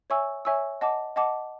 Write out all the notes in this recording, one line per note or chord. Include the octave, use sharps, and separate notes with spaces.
C#5 E5 G#5 C#6 E6
C#5 E5 G#5 C#6 E6
D#5 F#5 A5 D6
D#5 F#5 A5 D6